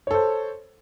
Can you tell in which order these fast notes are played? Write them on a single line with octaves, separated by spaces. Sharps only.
C#5 A4 C5